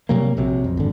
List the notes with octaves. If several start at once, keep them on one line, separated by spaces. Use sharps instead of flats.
C3 F#3 G3 A#3
A#1 C3 F#3
F2
G#1 D3